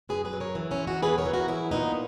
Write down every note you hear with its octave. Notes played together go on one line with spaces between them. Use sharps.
F#2 G#4 B4
G#4 B4
F#3
A#4 C#5
E3
C#4 E4
G#2
D#4 F#4
E2 G#4 B4
A#4 C#5
E3
F#4 A#4
F#3 E4 G#4
A#2 B3 D#4